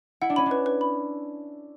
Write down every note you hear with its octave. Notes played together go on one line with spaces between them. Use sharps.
E4 F#5
D4
C#4 B5
D4
B4
B4
B5